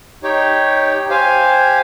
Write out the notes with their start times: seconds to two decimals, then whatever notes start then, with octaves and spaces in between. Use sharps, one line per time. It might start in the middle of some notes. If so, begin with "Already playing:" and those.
0.23 D#4 G4 C#5 G5
1.09 G4 C5 F5 G#5